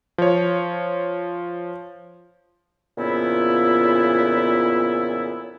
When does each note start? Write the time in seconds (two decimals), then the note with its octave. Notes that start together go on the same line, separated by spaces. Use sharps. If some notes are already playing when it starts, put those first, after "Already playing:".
0.18 F3 C#5
2.98 F2 A#2 C#3 B3 E4